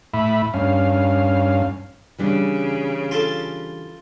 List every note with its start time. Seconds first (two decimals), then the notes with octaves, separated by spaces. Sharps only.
0.14 A2 E5 B5
0.54 G2 C#4 F5
2.18 C#3 E3 G3 D4
3.11 F4 A4